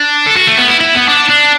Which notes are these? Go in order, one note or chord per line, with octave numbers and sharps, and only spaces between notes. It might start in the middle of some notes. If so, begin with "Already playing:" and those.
Already playing: D4
A4
F#4
A3
B3
E4
E4
B3
D4
D4